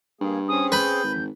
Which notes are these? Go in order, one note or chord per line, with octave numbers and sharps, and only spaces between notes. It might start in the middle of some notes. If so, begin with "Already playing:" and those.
G2 A#3 G#4
C4 C#4 G#4 D#6
B4 B5 G6
G#1